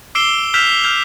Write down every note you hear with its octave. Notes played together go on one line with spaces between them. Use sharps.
D6 E6 C7 D7 E7 G7
E6 F6 G6 B6 E7 F7
F6 G6 F7